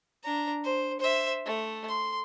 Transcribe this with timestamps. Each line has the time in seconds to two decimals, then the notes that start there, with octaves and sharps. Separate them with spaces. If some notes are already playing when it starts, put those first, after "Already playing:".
0.23 D4 A#5
0.64 C5
1.00 C5 E5
1.46 A3
1.89 C6